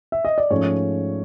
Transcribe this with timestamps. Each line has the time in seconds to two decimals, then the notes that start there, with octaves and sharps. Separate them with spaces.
0.12 E5
0.25 D#5
0.38 D5
0.51 G#2 F3 A3 C#4 C#5